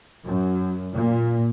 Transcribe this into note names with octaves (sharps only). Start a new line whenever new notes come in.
F#2
A#2